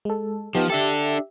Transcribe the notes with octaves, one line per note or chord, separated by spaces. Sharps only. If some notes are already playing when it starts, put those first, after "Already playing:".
G#3 A4
F3 B3 D#4 G4
D4 G4 A4 E5